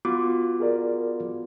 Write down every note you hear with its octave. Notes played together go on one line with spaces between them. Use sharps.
B3 F4 F#4 D6
G#4 A#4 D5